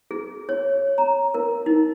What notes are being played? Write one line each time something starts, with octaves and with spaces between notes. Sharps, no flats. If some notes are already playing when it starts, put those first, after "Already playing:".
G#4
C#5
A#5
A#4
D#4